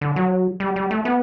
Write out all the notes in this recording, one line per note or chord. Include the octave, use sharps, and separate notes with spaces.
D3
F#3
G3
G3
A3
B3